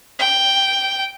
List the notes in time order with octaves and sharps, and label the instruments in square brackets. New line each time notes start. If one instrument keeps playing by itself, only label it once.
[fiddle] G5